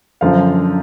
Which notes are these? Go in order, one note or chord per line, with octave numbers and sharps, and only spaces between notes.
F#2 D3 F3 F5